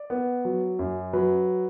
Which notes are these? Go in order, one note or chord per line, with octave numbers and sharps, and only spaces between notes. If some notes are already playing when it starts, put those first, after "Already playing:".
Already playing: D5
B3
F#3
F#2
F#3 B4